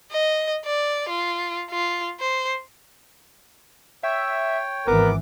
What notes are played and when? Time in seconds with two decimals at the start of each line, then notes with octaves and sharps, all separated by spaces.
0.12 D#5
0.65 D5
1.09 F4
1.70 F4
2.20 C5
4.03 C#5 E5 G5
4.87 G#1 E3 B3 A#4 D6